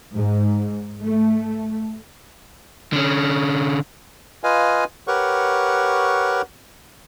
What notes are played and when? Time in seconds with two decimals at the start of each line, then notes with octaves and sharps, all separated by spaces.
0.13 G#2
1.02 A3
2.93 D3 C#4
4.44 F4 B4 D#5 F5 G#5
5.07 G4 A#4 B4 C#5 F#5 C#6